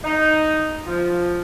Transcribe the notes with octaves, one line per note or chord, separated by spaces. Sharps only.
D#4
F3